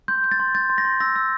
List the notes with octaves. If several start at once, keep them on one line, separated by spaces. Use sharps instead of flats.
C6 G6
G6
A6
C6
G6 A6
C6
A#6
C6
E6 A#6
E6